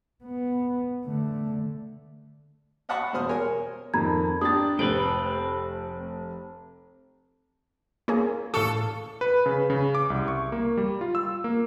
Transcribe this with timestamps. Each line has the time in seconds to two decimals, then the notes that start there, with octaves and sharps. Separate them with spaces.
0.24 B3
1.05 D3 A3
2.89 D#5 F5 F#5 A5 B5 C#6
3.13 E2 B2 F#4 C5 D#6 F6
3.29 G#4 A#4 C#5 G#5
3.94 F2 D#3 A#5 B5 G#6
4.41 D4 G4 D#6 A6
4.79 F1 A3 C4 B4 D7
8.08 A#3 C#4 G#4
8.54 A2 A4 F5 C#6
9.21 B4
9.46 C#3
9.70 C#3
9.95 D6
10.10 C2
10.28 C#6
10.52 A#3
10.77 G3
11.01 F4
11.15 E6
11.44 A#3